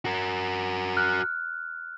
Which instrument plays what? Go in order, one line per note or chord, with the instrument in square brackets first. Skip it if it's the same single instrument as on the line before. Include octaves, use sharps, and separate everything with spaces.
[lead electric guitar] F#4 A#4
[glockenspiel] F6 F#6